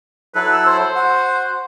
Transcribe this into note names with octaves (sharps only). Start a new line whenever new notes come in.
F#3 E4 A4 B4
E6
C5
F#4 F#5